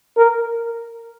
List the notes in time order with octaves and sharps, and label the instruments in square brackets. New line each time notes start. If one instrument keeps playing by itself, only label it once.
[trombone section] A#4